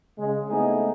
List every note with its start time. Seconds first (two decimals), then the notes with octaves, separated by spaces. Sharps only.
0.18 C#3 G#3
0.49 A3 B3 C4 D#4 E4 G#4